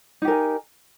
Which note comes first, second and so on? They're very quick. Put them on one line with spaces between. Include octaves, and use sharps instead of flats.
D#4 G4 A#4 G#5